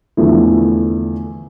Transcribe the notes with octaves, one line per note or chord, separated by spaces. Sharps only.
E2 D3 F3 A3 E4